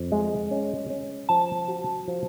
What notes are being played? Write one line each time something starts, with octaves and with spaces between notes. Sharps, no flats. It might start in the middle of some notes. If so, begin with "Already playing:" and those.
Already playing: F2
G#3
C#4
C#4
F3 A5
F#4
F3